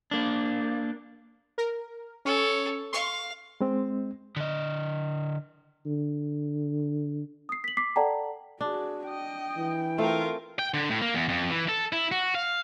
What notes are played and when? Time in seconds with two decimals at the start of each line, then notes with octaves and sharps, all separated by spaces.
0.11 A#3 D4
1.58 A#4
2.25 C#4 A4 C#5
2.93 F5 C6 C#6
3.61 G#3 C4
4.36 D3 D#5
5.86 D3
7.49 D#6 C7
7.64 B6 F#7
7.77 D6 B6 C7
7.96 A4 D5 F#5 G5 A5 A#5
8.61 D4 F#4 G#4
9.09 D#5 G5
9.58 E3
9.98 A3 C4 F4 A#4
10.59 G5
10.74 D3
10.90 A2
11.02 A#3
11.15 E2
11.29 F2
11.50 E3
11.69 A4
11.93 E4
12.12 F#4
12.35 F5